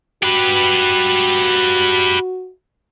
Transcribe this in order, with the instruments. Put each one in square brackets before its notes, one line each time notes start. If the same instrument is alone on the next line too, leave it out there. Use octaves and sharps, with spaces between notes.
[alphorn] F#4 [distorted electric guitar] G4 B4